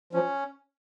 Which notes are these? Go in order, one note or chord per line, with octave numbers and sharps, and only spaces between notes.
F3 C#4